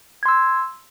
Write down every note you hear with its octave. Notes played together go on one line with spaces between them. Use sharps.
C6 E6 G#6